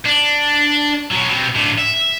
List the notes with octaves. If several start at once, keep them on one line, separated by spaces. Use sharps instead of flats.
D4
B2 F#3
B2 C4
A2 D3
E5